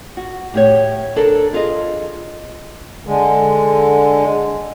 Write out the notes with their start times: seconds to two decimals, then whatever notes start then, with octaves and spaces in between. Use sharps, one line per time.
0.17 F#4
0.54 A2 G4 C#5
1.16 D4 A4 A#4
1.53 E4 F4 G#4 D#5
3.06 D3 G#3